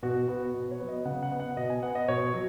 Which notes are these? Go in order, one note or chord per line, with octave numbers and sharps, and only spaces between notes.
B2 F#4
B3 F#4
B2
C#5
F#3 B3
D#5
C#3 F#5
F#5
B3
F#5
B2 D#5
G#5
B3 F#5
D#5
B2 C#5
F#3